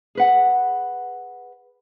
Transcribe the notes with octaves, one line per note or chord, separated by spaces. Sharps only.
G#4 B4 F#5